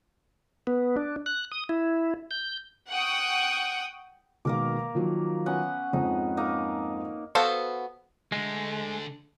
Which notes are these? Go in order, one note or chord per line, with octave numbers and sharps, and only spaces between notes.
B3
D4
F#6
D#6
E4
G6
F#5 G5 C#6 D#6
B2 D#3 G#3 A#3 A#4 D6
D#3 F3 F#3
B3 C#4 F#5
F2 G#2 C4 D#4
A#3 D#4
B3 F#4 A4 C5 F5
D3 G#3 A3